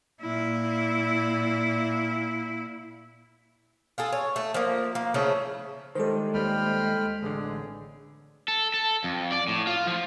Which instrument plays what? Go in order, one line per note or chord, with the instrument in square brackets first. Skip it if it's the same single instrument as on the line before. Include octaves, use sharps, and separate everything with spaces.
[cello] A#2 E4
[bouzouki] F4 G#4 A4
C#5
A3
F3 A#3
A#3
C#3 F3 A3 E4
[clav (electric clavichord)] D#3 G3 [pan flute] G#3 [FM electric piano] A4 C5
[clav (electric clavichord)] D#2 G3 [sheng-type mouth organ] G5 B5 F6
[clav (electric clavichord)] A1 D3 [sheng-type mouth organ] G#4
[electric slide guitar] A4
A4
F2
D5
A2
F4
F3